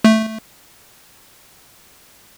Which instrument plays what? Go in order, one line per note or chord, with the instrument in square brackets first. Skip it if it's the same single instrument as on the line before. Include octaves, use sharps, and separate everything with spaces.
[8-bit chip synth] A3